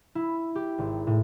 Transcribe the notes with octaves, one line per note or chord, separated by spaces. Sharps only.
E4
G4
G#1
A2